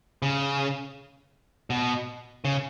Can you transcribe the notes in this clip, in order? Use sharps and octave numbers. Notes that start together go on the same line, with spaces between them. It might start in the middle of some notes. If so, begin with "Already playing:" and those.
C#3
B2
C#3